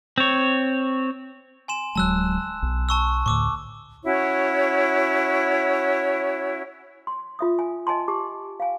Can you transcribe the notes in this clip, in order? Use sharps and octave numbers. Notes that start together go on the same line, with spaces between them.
C4 C#5
G#5 C6 E7
D1 F#3 G#3 A5 E6 F#6
B1
A5 C#6 E6
D2 A2 C#6 D6 E6
C#4 E4 F#4 C#5
C6
F4 E5 D#6
G#5
D#5 G#5 A5 C6
G4 A5 D6
F5 G#5